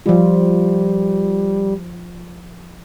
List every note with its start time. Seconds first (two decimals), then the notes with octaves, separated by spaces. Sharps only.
0.06 F3 G3 F4